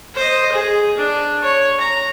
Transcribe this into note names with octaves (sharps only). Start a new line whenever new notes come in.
C5 D#5
G#4
D4
C#5
A#5